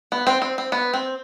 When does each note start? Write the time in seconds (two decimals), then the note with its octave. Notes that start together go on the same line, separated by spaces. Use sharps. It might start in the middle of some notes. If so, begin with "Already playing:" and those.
0.12 B3
0.27 C4
0.42 C4
0.58 C4
0.72 B3
0.94 C4